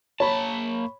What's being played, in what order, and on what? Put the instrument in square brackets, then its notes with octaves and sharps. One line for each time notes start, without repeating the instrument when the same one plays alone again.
[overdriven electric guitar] A#3 A5 [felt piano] C#5 B5